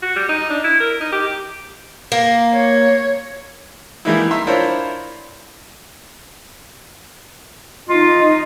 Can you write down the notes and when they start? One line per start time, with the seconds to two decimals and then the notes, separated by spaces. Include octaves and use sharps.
0.02 F#4
0.16 G3
0.29 D#4
0.50 D4
0.64 E4
0.80 A#4
1.01 D#4
1.12 G4
2.12 A#3
2.53 C#5
4.05 E3 G3 G#3 A#3 D#4 E4
4.31 E5 A#5 C6
4.47 D4 E4 F4 A#4 C5 C#5
7.89 D#4 F4 D#5